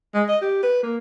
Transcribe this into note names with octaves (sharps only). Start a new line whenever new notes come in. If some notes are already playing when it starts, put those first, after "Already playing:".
G#3
D#5
G4
B4
A#3